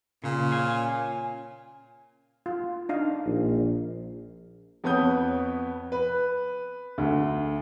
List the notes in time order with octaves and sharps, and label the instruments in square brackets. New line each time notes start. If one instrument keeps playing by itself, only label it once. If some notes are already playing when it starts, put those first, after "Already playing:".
[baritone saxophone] A#2 [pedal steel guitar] C#3
[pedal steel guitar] C#4 F5 G#5
[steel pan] F4
D4 D#4 F5
[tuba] A#1
[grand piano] F2 B3 C#5 D#6 G6
B4
D2